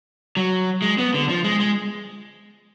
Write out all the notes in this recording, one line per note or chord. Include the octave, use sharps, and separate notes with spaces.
F#3
G#3
B3
D3
F3
G#3
G#3